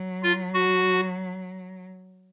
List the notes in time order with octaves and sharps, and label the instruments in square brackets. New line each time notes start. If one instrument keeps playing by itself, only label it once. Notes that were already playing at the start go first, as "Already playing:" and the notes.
Already playing: [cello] F#3
[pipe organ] F4
F#4